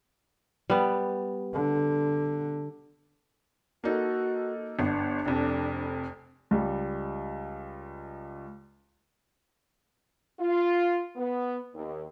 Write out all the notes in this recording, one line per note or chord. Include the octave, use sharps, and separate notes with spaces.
G3 B3
D3
A#3 D#4 F#4 A4
G1 B3 D4
F1 F2
C#2 G3
F4
B3
D#2